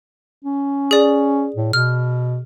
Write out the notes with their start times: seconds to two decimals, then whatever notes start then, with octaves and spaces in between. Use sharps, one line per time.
0.45 C#4
0.91 G#4 D5
1.56 A2
1.73 B2 F6